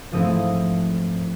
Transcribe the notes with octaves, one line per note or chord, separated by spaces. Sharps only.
G#2 F3 A3 C4 E4 D#6